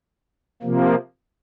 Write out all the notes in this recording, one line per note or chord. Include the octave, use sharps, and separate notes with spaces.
C3 F3 A#3